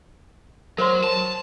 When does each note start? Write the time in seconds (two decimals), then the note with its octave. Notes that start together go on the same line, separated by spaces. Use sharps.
0.78 F#3 A#4 C5 C6
1.04 A5